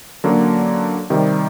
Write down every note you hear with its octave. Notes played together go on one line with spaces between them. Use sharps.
D3 F#3 A#3 C#4
C3 D#3 G3